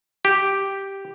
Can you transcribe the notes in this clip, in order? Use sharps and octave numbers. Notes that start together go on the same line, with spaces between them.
G4